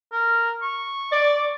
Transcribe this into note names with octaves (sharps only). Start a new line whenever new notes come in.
A#4
C#6
D5